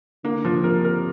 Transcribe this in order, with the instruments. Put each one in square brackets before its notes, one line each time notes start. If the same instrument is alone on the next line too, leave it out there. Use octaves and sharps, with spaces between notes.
[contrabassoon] D3 [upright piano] A#3
[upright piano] F3
[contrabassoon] C3 [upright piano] A#4
[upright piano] A#4